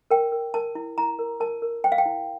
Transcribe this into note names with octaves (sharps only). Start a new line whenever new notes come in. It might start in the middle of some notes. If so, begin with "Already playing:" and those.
A#4 G5
A#4
A#4 A5
E4
E4 A#5
A#4
A#4 A5
A#4
C5 G5
F5
G5
E4